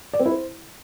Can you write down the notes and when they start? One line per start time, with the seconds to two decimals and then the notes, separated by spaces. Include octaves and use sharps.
0.13 D5
0.19 C4
0.25 E4
0.31 C5